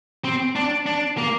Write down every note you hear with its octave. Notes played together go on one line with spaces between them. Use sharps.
C4
D4
D4
A#3